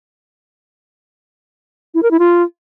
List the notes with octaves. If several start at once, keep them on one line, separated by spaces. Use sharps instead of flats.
E4
A#4
E4
F4